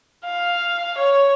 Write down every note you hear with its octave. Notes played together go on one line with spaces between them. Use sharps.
F5
C#5